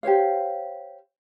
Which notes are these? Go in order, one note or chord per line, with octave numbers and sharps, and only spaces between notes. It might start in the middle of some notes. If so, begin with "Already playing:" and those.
G4 C5 C#5 F5